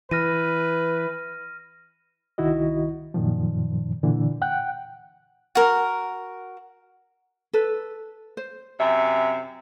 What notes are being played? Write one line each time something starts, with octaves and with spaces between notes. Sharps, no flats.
E3 B4 F6 A#6 D#7
C2 D#3 E4 F#4 D#5
F#2 A#2 D#3 F3
A#2 D3 E3
F#5 G5 F#6
F#4 A#4
A4 B4
C5
F#2 C3 E5